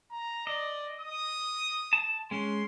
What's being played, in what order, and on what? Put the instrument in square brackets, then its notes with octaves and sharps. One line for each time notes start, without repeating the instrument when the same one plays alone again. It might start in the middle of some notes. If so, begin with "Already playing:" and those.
[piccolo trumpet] A#5
[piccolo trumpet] D5 [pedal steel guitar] D#5
[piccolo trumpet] D#6
[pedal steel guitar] A5
[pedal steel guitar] G#3 C#4 [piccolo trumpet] C6